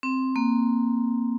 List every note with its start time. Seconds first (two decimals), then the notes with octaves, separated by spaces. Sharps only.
0.03 C4
0.36 A#3